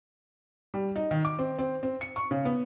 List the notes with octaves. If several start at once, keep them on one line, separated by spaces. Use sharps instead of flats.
G3
D#4
D#3
D6
C4
C4
C4
C#7
C#6
C#3
B3